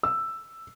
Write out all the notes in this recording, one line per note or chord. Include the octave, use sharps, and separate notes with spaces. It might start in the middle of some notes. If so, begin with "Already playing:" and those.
E6